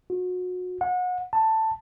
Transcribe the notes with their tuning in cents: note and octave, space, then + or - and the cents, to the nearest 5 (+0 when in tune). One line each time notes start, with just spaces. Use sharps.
F#4 -30
F#5 -30
A5 +10